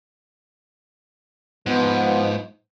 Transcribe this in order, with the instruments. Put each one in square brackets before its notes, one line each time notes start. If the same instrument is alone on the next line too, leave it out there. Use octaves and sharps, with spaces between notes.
[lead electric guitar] G#2 [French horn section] F3 B3